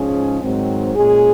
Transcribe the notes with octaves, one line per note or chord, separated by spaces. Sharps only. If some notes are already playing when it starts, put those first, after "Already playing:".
Already playing: G#2 F3 G#3 C#4 G#4
G#2 D#3 F#3 C4
A#2 G#3 C#4 G#4